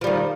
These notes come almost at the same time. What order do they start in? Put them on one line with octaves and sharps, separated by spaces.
F3 G3 D#3